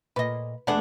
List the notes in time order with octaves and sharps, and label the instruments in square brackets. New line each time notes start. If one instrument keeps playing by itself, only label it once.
[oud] A#2 D#5 [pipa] B4
[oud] E2 A3 G#4 [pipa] B3 D4 F#5